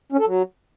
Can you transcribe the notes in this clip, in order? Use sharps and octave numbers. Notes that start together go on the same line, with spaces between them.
C#4
A4
F#3